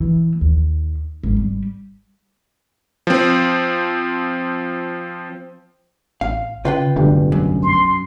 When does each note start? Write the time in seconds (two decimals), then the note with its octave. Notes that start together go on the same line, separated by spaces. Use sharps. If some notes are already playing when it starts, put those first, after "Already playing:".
0.01 E3
0.41 D#2
1.23 G#1
1.37 G3
3.07 F3 C4
6.21 A1 F5
6.65 C#3 F4 B4 G5
6.96 F1 B1 G2 D3
7.32 F#2
7.63 C6